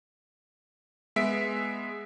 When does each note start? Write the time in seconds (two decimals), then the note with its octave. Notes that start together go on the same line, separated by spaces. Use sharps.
1.16 G#3 B3 E5 B6 D7